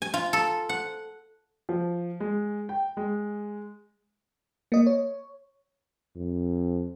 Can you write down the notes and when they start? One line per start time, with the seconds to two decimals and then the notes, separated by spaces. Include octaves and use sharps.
0.02 G#5
0.14 F4
0.33 A4
0.69 F#5
1.69 F3
2.20 G#3
2.69 G5
2.97 G#3
4.72 A#3 D#5
4.87 C#5
6.16 F2